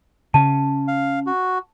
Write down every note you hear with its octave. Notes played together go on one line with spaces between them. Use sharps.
C#3 C#4 A5
F5
F#4